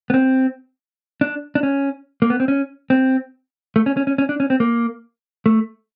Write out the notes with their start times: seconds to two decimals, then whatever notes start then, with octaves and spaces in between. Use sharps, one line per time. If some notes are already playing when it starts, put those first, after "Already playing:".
0.10 B3
0.14 C4
1.21 D4
1.55 D4
1.63 C#4
2.22 A#3
2.30 B3
2.40 C4
2.48 C#4
2.90 C4
3.76 A3
3.86 C#4
3.97 C#4
4.07 C#4
4.18 C#4
4.29 D4
4.40 C#4
4.50 C4
4.60 A#3
5.46 A3